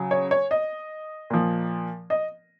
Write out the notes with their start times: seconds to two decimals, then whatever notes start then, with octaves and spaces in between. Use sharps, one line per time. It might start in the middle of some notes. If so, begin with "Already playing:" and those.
Already playing: C#3 F#3
0.11 C#5
0.31 C#5
0.51 D#5
1.30 A#2 F3
2.10 D#5